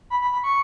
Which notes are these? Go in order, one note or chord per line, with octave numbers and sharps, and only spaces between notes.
B5
B5
B5
C#6